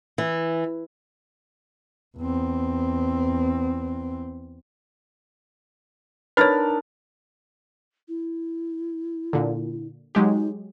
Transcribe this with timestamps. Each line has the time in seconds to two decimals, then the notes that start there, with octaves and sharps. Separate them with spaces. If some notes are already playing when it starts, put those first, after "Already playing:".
0.18 E3
2.18 E2 C4
6.37 D4 D#4 A#4 B4 C#5 B5 F6 A6
8.08 E4
9.33 A#2 D3
10.15 F#3 G#3 D#4 G4